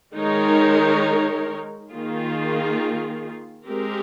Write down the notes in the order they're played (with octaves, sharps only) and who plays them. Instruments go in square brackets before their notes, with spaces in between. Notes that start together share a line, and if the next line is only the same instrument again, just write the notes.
[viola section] D#3 G#3 D#4 A#4 C#5
D#3 A#3 F4 G#4
G#3 C4 G4 A#4